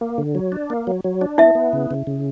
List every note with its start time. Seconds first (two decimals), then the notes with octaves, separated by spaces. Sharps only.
0.01 A#3
0.18 D3
0.35 F#3
0.52 D4
0.70 A#3
0.87 F#3
1.04 F#3
1.21 D4
1.38 B3 E4 E5
1.55 B3
1.73 C#3
1.91 C#3
2.07 C#3